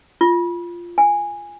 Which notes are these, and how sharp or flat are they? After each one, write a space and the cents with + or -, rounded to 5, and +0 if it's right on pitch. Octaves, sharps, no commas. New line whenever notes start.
F4 -10
G#5 -10